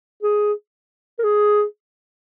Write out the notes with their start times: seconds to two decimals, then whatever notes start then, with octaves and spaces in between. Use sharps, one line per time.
0.23 G#4
1.19 A#4
1.23 G#4